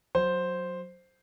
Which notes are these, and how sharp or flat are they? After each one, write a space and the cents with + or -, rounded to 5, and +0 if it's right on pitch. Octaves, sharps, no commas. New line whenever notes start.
F#3 -10 C5 +0